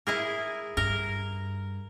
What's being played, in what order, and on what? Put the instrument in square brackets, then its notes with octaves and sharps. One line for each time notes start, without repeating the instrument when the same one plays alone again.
[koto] E4 G#4 A#4
[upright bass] G2 [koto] A#4